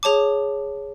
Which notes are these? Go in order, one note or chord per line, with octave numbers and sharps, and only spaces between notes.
G#4 C#5 A5 D6